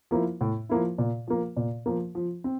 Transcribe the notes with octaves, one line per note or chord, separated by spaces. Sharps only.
F3 A#3 E4
A2
F3 A#3 E4
A#2
F3 A#3
A#2
F3 A#3
F3
C4